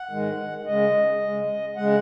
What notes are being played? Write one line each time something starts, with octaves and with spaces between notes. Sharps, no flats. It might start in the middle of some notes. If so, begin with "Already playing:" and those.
Already playing: F#5
G#2 D#3 G#3
C#3 G#3 D#5
C#3 G#3
C#3 G#3 F#5